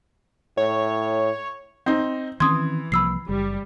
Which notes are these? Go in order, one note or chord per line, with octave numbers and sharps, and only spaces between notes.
A2 C#5
C4 D#4
D#3 E3 C4 C#4 C6 D#6 G#6
C2 F3 A#3 B5 E6 C7
F#1 G3